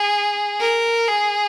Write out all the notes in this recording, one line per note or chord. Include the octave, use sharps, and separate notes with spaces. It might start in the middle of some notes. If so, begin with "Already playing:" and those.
Already playing: G#4
A#4
G#4